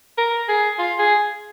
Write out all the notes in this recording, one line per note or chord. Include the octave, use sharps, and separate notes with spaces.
A#4
G#4
F4
G#4